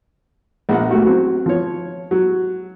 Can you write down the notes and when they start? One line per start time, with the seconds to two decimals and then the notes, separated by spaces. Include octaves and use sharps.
0.69 A#1 A#3 F#5
0.89 A3 F#4 G4
1.05 F#3 C4
1.46 F3 C#5
2.11 F#3